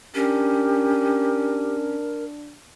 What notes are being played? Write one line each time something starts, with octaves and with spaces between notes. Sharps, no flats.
C#4 D4 G4 A#4